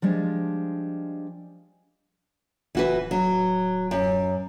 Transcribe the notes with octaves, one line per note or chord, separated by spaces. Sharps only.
F3 G3 G#3 D4
F#1 E3 F#4 B4
D1
F#3
F#2